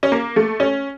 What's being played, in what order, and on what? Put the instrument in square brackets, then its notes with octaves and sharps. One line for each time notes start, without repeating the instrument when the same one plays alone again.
[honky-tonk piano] C#4
A#3
A3
C#4